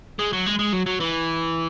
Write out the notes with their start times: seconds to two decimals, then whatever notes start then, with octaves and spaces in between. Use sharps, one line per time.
0.19 G#3
0.33 F#3
0.46 G#3
0.59 G#3
0.73 F#3
0.86 F#3
1.00 E3